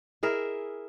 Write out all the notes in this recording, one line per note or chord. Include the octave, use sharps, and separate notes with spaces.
E4 G#4 A#4 E5